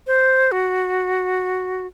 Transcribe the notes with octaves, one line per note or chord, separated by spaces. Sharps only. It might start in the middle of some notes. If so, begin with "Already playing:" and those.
C5
F#4